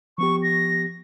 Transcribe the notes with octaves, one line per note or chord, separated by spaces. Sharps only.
F3 B3 G4 C#6
A#6